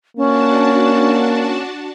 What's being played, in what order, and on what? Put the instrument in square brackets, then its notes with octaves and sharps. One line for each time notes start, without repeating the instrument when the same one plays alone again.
[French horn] A#3 [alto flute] C#4 [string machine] D4 F#4 A5